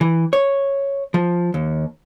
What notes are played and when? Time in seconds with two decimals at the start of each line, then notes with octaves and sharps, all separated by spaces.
0.01 E3
0.33 C#5
1.14 F3
1.54 D#2